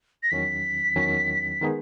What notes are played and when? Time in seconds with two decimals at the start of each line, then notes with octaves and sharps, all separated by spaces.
0.23 A#6
0.31 E2 D#3 F#3 C#4 B6
0.96 E2 D#3 F#3 C#4
1.61 D#3 G#3 B3 D#4 G#4